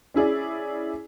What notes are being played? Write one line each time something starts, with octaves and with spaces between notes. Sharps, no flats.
C#4 E4 G#4 D5